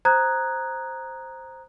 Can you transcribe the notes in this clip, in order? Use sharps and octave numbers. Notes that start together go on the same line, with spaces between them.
C5 A#5 D#6 F#6 G#6